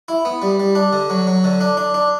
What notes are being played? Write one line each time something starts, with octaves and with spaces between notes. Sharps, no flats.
E4
B3
G3
G3
D4
D3
F#3
F#3
D3
D4
D4
D4